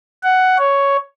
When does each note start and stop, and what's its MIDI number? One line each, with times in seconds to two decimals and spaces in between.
0.23 0.57 78
0.58 0.97 73